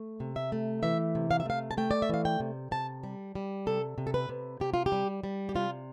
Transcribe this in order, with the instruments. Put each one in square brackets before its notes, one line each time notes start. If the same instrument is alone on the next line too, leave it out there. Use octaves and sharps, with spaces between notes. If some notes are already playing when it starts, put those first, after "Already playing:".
Already playing: [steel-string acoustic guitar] A3
C3
E5
A3
E3 E5
C3
F5
E5
A3 F5
A5
A3 G5
D5
E5
E3 F5
G5
C3
C3 A5
G3
G3
C3 A4
C3
A4
B4
C3
C3 G4
F4
G4
G3
G3
G4
C3 F4